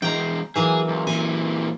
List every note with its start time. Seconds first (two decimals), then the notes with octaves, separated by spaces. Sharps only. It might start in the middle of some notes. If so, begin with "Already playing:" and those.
0.02 E2 G#3 G5 A#5
0.56 E3 F#3 A#3 G#4
0.88 C#2
1.07 A#2 E3 G#5